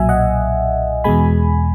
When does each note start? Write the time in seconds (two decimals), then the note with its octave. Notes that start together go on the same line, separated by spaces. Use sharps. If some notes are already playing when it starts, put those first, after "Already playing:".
Already playing: B1 A#2 F#3 E5 G#5
0.09 D#5 F#5
1.04 E2 B2 G#3 G#5 B5